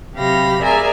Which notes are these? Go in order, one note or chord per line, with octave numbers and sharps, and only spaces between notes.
C3 F#3 G4 F5 B5 A#6
G#4 A#4 D5 E5 G#5 A#5